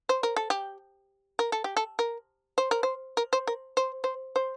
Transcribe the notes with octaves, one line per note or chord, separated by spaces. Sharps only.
C5
A#4
A4
G4
A#4
A4
G4
A4
A#4
C5
A#4
C5
A#4
C5
A#4
C5
C5
C5